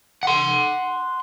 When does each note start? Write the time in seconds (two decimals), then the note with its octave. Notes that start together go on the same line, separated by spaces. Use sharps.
0.23 F#5 C6